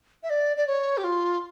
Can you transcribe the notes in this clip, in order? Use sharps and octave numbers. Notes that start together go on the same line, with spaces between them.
E5
D5
D5
C#5
G4
F4